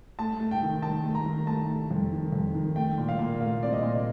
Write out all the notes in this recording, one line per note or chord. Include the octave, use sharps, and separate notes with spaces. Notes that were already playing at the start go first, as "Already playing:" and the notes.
A3 A5
A3
G5
D#3
D#3 A5
A3
A#5
D#3
A3 A5
A3
F2
D#3
F2
D#3
A3 G5
A#2
F5
A#2
A3 F5
C4 D5
D#5
A#2